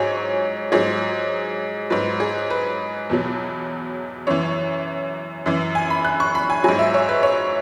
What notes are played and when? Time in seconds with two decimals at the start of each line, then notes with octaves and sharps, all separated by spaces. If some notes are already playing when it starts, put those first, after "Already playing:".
Already playing: G#2 F#3 C#5 G#5
0.72 G#2 F#3 G#4
1.90 G#2 F#3 B4
2.20 G#4
2.50 B4
3.10 E2 B2 F#3
4.27 F#2 E3 C#5
5.46 F#2 E3
5.75 G#5
5.90 B5
6.05 F#6
6.20 C#6
6.35 B5
6.50 G#5
6.64 G#2 F#3 G#5
6.79 E5
6.94 C#5
7.09 B4
7.23 C#5